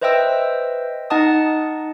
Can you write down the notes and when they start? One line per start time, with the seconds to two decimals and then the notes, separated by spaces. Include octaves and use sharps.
0.02 B4 C5 D#5 E5 G5 E6
1.10 D#4 D#5 F#5 A5 D#6